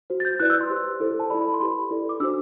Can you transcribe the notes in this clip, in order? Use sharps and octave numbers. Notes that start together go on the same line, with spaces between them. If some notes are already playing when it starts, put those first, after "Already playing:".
F#4 C5
A6
G6
E4 B4 D5 F#6
E6
C6
G4 C5
E4 A4 C5
A5
E4 A4 D5 B5
C6
E4 G4 B4 B5
E4 A4 D5
D6
D4 F#4 C5 E6